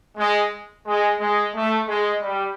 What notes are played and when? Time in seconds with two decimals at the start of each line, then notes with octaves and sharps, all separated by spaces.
0.18 G#3
0.86 G#3
1.20 G#3
1.54 A3
1.88 G#3
2.22 G3